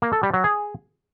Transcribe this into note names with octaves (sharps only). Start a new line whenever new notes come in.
A#3
A4
G3
F#3
G#4